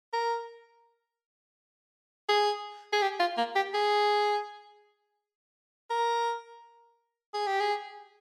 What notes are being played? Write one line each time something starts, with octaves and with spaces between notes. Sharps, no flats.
A#4
G#4
G#4
G4
F4
A#3
G4
G#4
A#4
G#4
G4
G#4